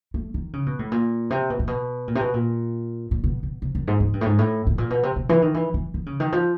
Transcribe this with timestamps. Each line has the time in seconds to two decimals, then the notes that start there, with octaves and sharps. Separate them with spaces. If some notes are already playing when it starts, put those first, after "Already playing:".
0.14 A3
0.34 D#3
0.53 C#3
0.66 B2
0.79 A2
0.92 A#2
1.30 C3
1.50 B2
1.59 A#2
1.67 B2
2.08 A#2
2.15 C3
2.21 B2
2.34 A#2
3.11 A#2
3.24 B2
3.43 B2
3.62 C3
3.75 F#2
3.88 G#2
4.00 G#2
4.13 G2
4.21 A2
4.26 G#2
4.39 A2
4.67 A2
4.78 A#2
4.90 B2
5.03 C3
5.16 B2
5.29 E3
5.42 D#3
5.54 E3
5.74 E3
5.94 D#3
6.06 C#3
6.20 D#3
6.32 F3